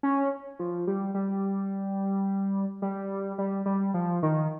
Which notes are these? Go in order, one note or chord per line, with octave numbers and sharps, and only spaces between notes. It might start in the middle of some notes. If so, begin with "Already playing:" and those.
C#4
F3
G3
G3
G3
G3
G3
F3
D#3